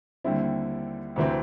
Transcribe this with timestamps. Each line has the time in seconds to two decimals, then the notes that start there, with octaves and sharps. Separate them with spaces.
0.24 D#2 D3 G3 C4 E4
1.16 D2 C3 E3 A3 C4